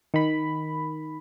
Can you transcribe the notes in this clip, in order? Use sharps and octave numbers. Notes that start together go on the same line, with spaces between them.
D#3 B5